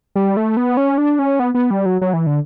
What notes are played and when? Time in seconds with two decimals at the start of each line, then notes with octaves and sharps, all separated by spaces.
0.16 G3
0.37 A3
0.57 B3
0.77 C#4
0.98 D4
1.19 C#4
1.40 B3
1.55 B3
1.71 G3
1.86 F#3
2.01 F#3
2.13 E3
2.27 D3